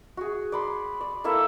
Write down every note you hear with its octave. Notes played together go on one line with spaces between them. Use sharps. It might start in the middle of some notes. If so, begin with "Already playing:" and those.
F#4 G#4
D5 B5 C6
D5
A#3 E4 A4 E5